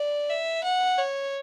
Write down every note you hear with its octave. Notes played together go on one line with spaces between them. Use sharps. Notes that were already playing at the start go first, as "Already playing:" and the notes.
Already playing: D5
E5
F#5
C#5